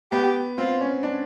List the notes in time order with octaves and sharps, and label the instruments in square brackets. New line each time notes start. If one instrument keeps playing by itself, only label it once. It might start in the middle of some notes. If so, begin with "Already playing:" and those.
[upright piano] B3 [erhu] G4
[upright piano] C4 [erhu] F4
[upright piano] C#4
D4